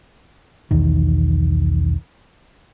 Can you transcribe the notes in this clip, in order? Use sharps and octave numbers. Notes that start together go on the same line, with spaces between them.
B1 E2 D#3